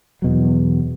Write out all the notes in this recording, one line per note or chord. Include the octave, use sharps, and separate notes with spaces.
E2 B2 F#3